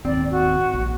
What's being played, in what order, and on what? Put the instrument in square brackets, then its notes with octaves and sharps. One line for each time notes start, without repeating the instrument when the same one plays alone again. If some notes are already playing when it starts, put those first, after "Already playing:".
[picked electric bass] D#1 G#1 C4 [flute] D5
[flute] F#4
[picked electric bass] A#1